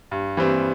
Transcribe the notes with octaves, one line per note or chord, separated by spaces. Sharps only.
G2
E3 G3 C4